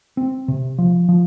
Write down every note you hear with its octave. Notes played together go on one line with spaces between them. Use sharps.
C4
C3
F3
F3